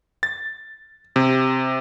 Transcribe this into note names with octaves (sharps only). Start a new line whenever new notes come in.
A6
C3